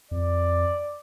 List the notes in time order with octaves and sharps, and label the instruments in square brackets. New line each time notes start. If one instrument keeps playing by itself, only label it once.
[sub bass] F2 [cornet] D5